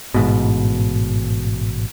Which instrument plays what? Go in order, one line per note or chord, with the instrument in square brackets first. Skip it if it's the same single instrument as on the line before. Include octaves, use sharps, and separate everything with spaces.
[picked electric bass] A1 G#2 B2